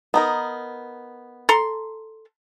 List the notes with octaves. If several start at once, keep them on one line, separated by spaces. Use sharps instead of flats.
B3 D#4 A#4
A4 A#5 C6